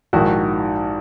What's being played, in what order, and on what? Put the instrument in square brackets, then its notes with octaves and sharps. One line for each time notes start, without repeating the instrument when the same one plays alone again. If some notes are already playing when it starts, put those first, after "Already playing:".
[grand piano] A#1 G#2 D#3 [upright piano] E4 F#4